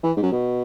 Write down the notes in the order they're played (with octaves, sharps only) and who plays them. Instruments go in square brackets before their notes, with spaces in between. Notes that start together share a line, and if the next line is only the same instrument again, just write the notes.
[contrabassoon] E3
G#2
F#2
B2